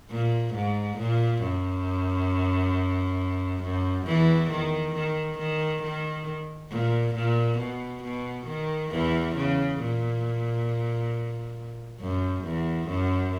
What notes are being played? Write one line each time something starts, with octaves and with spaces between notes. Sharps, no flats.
A#2
G#2
A#2
F#2
F#2
E2 E3
D#3
D#3
D#3
D#3
A#2
A#2
B2
B2
D#3
E2 E3
C#3
A#2
F#2
E2
F#2